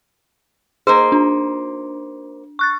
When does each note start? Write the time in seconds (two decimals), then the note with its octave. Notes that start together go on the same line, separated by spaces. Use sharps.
0.87 A#3 D#4 G#4 C5
1.12 D4
2.59 C#6 F#6 A6